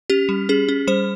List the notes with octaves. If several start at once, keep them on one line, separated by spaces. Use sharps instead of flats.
C#4 G4
G3
C#4 G#4
C#4
G3 C5